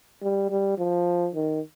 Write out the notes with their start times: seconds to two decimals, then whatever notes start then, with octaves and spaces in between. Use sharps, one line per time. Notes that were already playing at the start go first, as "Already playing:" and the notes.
0.22 G3
0.50 G3
0.78 F3
1.35 D#3